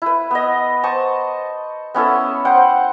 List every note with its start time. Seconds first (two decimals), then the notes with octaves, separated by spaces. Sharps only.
0.02 E4 B4
0.31 B3 D#5
0.83 C5 A5 C#6 D#6
1.94 B3 C#4 E4 A4
2.45 C5 F#5 G5